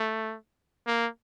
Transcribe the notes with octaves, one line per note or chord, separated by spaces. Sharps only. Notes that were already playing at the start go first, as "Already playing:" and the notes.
Already playing: A3
A#3